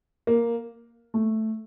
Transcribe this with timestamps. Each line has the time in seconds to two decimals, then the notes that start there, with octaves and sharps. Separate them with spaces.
0.27 A#3
1.14 A3